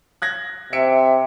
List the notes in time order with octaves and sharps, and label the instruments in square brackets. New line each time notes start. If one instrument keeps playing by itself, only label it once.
[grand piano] F#6 G#6 A#6
[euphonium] C3 [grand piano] E5 C#7 D7